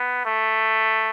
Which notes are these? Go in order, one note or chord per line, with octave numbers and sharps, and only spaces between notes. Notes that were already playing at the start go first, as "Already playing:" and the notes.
Already playing: B3
A3